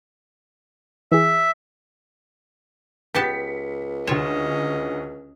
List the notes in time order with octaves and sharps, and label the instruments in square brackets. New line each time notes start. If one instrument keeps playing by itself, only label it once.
[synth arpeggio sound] E3 G#4 [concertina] E5
[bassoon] C#2 [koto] B3 G4 A5 [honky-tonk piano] B6 C#7
[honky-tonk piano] D2 E7 [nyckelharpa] C#4 D#5 [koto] F4 C#5